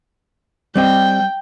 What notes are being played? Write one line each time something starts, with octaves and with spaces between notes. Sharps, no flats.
G3 C4 D#5 G5